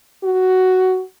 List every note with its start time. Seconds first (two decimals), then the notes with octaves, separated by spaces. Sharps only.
0.23 F#4